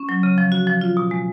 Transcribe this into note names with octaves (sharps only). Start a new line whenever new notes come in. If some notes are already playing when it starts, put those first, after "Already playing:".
Already playing: C#4
F#3
C#3
F3
F#4
F3
F4
B2
G#3